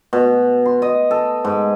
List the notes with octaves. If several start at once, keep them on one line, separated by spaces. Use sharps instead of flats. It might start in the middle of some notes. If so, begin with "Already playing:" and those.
B2
C6
D#5
A4
G#2